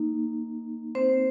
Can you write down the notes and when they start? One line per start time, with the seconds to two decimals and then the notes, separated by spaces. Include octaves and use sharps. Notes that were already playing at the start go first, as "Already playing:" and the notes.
Already playing: A#3 D#4
0.95 C4 C5